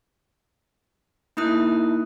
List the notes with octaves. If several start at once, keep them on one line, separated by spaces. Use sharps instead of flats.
A#3 D#4 E4 D#6 F#6